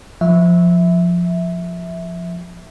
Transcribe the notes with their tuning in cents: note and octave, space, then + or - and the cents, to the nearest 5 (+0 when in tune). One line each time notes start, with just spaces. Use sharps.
F3 +5 E5 -15